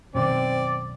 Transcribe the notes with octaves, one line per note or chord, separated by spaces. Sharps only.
F#2 B2 D#3 C4 D5